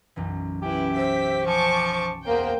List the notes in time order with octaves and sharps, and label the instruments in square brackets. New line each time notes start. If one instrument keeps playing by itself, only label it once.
[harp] B1 F#2 E3
[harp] C#4 [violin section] E4 B4 [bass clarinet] G4
[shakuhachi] C5 [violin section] E5 B6
[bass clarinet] F3 [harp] F#5 G#5 [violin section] A5 C#6 D6
[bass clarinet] E2 [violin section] A#3 C5 G5